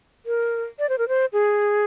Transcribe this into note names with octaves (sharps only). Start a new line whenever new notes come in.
A#4
D5
C5
A#4
C5
G#4